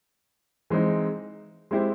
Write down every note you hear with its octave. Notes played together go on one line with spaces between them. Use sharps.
E3 G#3 C4 D#4
G#3 C4 E4 G4 C5